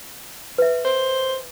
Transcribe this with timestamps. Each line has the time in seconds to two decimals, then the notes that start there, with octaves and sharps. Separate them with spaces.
0.58 B4 E5
0.85 C5